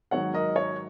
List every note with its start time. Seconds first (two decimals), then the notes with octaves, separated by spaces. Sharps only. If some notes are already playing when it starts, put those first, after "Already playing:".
0.11 G#2 D#3 F#3 C#5 F#5
0.34 A#4 D#5
0.56 C#5